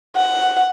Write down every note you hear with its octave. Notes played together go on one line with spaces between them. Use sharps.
F#5